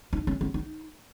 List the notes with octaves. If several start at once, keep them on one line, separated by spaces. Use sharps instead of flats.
D#4
C#4
C#4
D#4